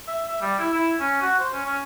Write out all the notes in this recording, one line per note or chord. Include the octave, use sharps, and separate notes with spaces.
E5
E5
G3
E4
E4
C#4
F#4
C5
C#4
C#4